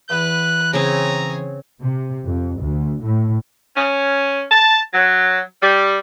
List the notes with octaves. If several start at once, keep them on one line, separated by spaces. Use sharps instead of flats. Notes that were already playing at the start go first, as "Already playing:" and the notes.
E2 B3 B4 F#6
C#3 C4 G#4 C#5 A#5
C3
F2
D2
A2
C#4
A5
F#3
G3